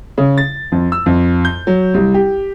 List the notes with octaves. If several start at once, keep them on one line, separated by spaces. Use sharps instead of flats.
C#3
A6
F2
E6
F2
G6
F#3
C2
G4